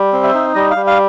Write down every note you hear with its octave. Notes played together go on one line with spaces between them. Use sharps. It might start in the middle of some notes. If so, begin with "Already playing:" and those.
Already playing: G3
C4
E5
D#4
G3 D#5
F5
G3
F5